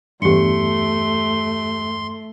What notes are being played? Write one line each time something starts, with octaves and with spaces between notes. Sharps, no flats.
E2 G2 A3 G4 C6 C#7